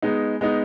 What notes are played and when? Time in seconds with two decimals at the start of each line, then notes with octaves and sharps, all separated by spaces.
0.02 G#3 B3 D#4
0.41 G#3 B3 D#4